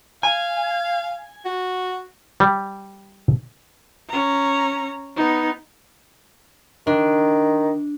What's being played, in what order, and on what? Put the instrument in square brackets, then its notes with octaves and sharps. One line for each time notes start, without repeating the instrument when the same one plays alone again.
[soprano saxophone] F5 [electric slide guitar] G#5
[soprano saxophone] F#4
[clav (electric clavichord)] G3
[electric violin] C#4 A#5
B3 D#4
[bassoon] D#3 [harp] D4